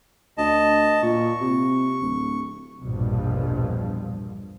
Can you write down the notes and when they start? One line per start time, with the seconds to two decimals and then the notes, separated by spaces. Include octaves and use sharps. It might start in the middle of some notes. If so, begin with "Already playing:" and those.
0.38 D2 D#5 A5
1.02 A#2 C#6
1.41 C3
2.01 D1
2.81 A#1 E2 G2 B2 F3